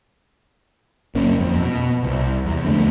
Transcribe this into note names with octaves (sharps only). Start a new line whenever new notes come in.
G1 F#2 A#3 C#4
F2
B2
C2
E2
F2 D3 E3 A3